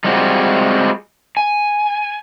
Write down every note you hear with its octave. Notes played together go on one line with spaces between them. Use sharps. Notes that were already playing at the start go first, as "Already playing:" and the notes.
G3 G#3 C4 F4 F#4
G#5